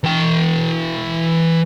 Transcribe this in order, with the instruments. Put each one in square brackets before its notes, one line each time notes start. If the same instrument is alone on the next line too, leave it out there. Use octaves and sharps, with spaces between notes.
[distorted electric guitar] E3 G5